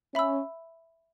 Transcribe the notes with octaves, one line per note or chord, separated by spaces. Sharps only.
C#4 E5 B5 E6